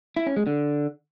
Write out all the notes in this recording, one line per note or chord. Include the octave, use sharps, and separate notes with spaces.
E4
C#4
G#3
D3